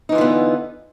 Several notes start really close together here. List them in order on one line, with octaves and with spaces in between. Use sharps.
D#4 E3 F4 D3 B3